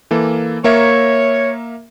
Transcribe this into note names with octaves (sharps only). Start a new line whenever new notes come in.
E3 A#3 A4
A#3 A#4 C#5 E5